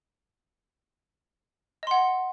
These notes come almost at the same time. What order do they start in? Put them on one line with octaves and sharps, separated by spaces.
D#5 C6 F#5